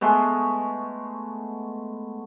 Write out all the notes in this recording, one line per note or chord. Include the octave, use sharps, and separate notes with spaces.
G#3 A3 B3